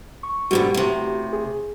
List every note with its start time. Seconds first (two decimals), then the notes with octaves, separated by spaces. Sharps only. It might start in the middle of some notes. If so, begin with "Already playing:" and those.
0.23 C#6
0.51 G#2 B2 D3 F#4 G4
0.74 A2 C3
1.33 G#4